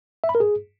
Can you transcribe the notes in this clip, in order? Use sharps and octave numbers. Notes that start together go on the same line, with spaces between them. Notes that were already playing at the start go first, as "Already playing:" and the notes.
E5
B5
A#4
G#4